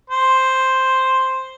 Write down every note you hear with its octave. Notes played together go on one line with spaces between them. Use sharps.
C5